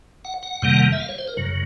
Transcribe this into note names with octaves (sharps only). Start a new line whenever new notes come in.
F#5
F#5
F2 C3 D#3 G3 A#3
E5
F5
C#5
C5
A#4
F#2 C#3 F#3